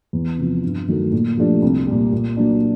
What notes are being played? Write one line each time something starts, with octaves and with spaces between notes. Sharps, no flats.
E2
C3 F3
G2
D#3 F#3 A3
A#2
F3 A3 D4 G4
C2
A#2 G3
A#2
F#3 A#3 D4